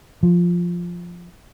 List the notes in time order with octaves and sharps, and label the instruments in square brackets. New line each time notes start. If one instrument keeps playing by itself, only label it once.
[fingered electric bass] F3